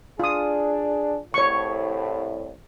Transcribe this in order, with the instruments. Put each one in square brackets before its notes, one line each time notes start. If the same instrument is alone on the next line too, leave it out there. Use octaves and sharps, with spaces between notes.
[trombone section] D4 G#4 [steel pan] F4 D#6
[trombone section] C2 A2 [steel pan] C#5 C#6